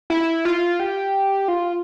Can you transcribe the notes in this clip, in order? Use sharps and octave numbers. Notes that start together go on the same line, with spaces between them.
E4
F4
G4
F4